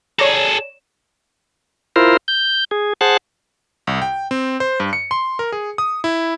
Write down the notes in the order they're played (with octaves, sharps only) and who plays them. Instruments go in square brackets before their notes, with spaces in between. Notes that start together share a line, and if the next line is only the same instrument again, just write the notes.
[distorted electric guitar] G#4 A4 [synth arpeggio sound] C#5 D5 A#5
[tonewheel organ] E4 F4 A#4 C5
G6
G#4
G#4 C5 F#5 A5
[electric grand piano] C2
G5
C4
C5
G2
C#7
C6
A#4
G#4
D#6
E4